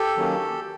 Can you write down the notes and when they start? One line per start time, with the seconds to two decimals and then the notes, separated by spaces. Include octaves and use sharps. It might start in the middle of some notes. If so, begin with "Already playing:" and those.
Already playing: G4 A4
0.17 D#3 F#3 A#3 C#4